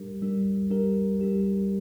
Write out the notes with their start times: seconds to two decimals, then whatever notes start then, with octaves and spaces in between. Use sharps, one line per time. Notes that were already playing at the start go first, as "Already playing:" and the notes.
Already playing: G3 D4 G4 A#4
0.22 G3 D4 G4 A#4
0.71 G3 D4 G4 A#4
1.20 G3 D4 G4 A#4